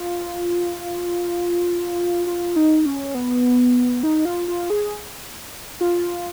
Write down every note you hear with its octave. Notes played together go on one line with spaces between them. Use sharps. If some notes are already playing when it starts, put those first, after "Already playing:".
Already playing: F4
F4
D#4
C#4
B3
D#4
F4
F4
G#4
F4